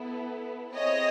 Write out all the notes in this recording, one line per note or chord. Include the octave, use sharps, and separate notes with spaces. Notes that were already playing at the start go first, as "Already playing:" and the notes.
Already playing: B3 E4 A4
C4 E4 G#4 C#5 D#5